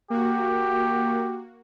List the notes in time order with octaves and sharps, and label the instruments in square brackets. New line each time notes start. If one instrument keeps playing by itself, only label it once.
[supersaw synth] A#3 F#4 [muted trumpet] G4